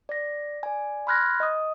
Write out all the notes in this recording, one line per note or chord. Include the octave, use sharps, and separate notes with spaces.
D5 A#6
D5 G#5
B5 C6 F6 F#6 G#6 A#6
D#5 D#6